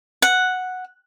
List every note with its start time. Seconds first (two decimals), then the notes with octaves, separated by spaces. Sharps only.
0.22 F#5